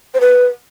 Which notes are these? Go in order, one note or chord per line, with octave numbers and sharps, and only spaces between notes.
C5
B4